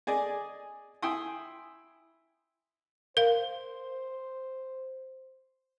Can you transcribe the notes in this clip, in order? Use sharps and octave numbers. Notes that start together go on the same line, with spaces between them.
G#4 D5 D#5 G#5
E4 G5 G#5 C6 D#6
A#4 C5 F5